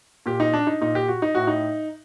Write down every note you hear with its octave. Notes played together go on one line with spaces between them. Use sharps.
A#2 G4
D#4
D4
D#4
A#2 D#4
G4
F#4
D#4
A2 F#4
D#4